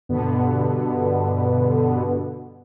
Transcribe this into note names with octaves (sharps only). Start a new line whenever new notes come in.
G2 B2 D3 B3